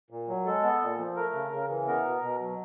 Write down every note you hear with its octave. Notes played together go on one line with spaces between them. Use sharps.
A#2
F#3
G#3 A4
B3
A#2
F3
A3 A#4
C#3
C#3
E3
B3 A#4
B2
B2
F#3